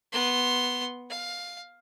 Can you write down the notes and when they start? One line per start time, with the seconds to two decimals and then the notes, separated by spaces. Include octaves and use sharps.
0.12 B3 C6
1.10 F5